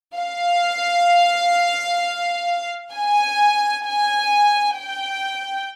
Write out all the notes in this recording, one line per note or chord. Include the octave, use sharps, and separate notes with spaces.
F5
G#5
G#5
G5